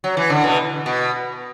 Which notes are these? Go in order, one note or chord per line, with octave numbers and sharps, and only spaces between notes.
F#3
E3
D3
B2 E3
B2